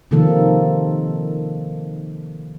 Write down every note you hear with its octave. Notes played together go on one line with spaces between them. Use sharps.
C3 D#3 F3 A#3 A4